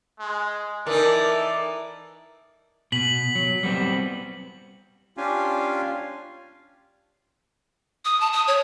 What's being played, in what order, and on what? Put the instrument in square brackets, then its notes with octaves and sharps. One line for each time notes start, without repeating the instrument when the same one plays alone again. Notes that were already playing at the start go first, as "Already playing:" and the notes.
[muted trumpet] G#3
[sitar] E3 D#4 [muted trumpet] A4 [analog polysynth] A#4 [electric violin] D5
[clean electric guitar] B2 [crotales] B6 F#7
[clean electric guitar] F#3
G3 B3 C4
[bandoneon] C#4 D4 F4 G4 F5 G#5
[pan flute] D#6
A5
D#6
C#5